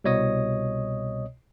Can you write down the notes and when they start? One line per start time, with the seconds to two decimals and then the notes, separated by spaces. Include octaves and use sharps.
0.04 C2 B2 C#5 D#5 D#6